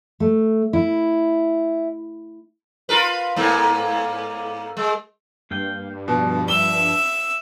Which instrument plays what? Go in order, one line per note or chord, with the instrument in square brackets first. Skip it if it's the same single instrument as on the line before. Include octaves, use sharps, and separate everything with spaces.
[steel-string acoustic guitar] A3
E4
[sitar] F4 A#4 B4
G#2 A#3 B3
G#3
[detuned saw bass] G2 [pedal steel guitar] A#3 F5 G5
[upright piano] B2 [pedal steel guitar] F3
[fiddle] E5 E6 [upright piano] G7